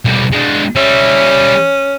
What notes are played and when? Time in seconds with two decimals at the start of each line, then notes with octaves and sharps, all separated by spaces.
0.05 B1 G3
0.32 G#3 D4
0.76 G3 C#4 E5